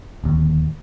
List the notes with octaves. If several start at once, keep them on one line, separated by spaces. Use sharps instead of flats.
D1 D#2